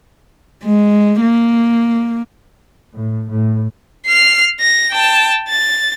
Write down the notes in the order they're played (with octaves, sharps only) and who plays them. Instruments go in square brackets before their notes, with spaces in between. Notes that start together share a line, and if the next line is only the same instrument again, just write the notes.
[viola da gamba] G#3
A#3
[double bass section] A2
A2
[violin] F6 C7
A#6
G5 A5
A6